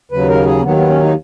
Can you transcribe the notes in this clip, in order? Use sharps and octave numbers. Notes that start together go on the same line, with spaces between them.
D#2 C#3 F#3 B4
A#4
G#4
A#3
D#2 D#3 F#3 B3
B3
C#4
D#4